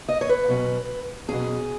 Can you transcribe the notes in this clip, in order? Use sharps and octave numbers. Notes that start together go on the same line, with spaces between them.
D#5
C#5
B4
B2 F#3 C#4
B2 F#3 C#4 G#4